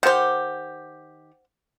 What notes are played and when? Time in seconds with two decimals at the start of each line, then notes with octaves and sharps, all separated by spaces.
0.03 D#3 G4 C5 F#5